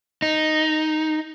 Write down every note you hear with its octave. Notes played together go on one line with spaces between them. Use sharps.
D#4